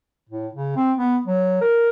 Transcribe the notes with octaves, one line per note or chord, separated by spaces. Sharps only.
A2
C#3
C4
B3
F#3
A#4